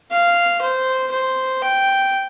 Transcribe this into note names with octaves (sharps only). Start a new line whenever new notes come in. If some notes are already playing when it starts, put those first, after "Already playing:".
F5
C5
C5
G5